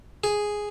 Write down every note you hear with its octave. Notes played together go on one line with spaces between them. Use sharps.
G#4